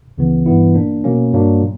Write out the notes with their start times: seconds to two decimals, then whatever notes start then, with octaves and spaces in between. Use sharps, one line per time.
0.18 C#2 C#3 E3 B3
0.46 G2 E3 B3 E4
0.75 A#2 A#3 D4
1.04 B2 F#3 A#3 C#4
1.33 G2 F#3 A#3 D4
1.62 A#2